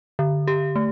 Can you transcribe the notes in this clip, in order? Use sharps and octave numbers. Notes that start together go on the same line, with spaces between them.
D3
G4
A3